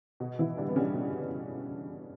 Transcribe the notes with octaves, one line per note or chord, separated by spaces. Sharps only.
B2
B2 E3 E4
D3 G3 D4
B3
C#3 G3 C#4
B2